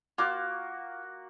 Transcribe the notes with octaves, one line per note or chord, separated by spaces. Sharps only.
A#3 F4 F#4 D6